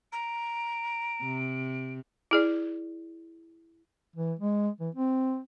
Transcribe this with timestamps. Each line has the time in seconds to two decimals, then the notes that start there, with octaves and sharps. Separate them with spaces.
0.12 A#5 D7
1.22 C3
2.31 E4 G#4 D5
4.16 E3
4.39 G#3
4.80 E3
4.95 C4